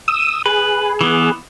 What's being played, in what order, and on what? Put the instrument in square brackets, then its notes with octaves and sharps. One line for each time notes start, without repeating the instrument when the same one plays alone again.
[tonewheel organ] D#6 E6
[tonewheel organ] G#4 [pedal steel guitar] B4
[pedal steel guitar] E3 B3